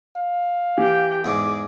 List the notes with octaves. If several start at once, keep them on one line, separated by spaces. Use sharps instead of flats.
F5
E3 G4 G5
E2 G#2 G#4 D6